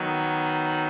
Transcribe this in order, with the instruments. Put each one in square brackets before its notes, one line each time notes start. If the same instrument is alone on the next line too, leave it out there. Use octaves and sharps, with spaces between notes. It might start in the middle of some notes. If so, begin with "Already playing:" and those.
Already playing: [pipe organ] D#3 F#3 B3 D#4